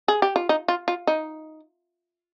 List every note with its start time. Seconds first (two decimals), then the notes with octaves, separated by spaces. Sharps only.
0.08 G#4
0.22 G4
0.36 F4
0.49 D#4
0.68 F4
0.88 F4
1.07 D#4